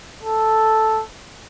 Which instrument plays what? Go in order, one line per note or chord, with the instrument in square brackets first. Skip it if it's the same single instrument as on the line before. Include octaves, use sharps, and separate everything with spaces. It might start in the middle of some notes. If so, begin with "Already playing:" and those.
[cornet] A4